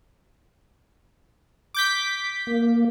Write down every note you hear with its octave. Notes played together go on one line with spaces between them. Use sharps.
D6 G6 B6
A#3